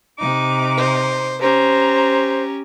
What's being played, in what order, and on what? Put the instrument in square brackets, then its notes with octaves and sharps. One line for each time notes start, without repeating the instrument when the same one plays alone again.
[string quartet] C3 D#4 D6
[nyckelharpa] C5
[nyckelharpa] C#4 G4 [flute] C5 [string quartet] A#5